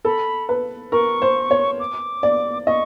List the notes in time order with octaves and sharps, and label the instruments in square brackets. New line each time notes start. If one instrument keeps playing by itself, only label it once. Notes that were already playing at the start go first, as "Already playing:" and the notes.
[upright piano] A4 [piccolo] B5
[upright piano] B4
[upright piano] A#4 [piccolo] C#6
[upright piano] C5
C#5
[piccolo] D6
[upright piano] D5
[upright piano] D#5 [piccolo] C#6